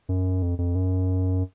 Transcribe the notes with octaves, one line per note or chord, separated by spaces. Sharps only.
F#2
F2
F2
F#2